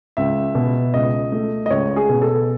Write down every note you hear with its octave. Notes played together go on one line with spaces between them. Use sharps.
C#2 E5
B2
C#2 D#5
A3
D#5
C#2 C#5
G#4
B2
A4